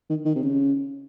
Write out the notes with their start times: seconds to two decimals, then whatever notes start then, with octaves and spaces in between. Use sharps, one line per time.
0.10 D#3
0.25 D#3
0.35 C3
0.43 C#3